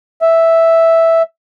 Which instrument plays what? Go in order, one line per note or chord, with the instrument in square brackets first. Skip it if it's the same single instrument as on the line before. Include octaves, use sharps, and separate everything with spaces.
[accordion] E5